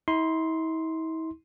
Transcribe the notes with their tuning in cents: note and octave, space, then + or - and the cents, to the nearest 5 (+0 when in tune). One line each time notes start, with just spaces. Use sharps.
E4 -45 C6 +0